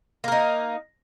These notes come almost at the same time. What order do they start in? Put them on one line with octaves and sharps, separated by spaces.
A#3 A#4 D#4